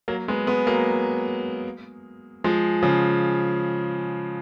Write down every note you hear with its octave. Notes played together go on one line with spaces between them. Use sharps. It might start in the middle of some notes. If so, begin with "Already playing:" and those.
F#3 A#3
G#3 B3
G#3 B3
F#3 A#3
F3 G#3
C#3 F3